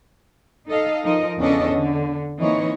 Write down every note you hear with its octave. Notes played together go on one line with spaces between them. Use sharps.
D#4 A4 D#5 F5
F3 D#4 A#4 D#5
E2 C#3 C#4 D4 A4 D#5
D3
E3 A#3 C4 D#4 C#5 D#5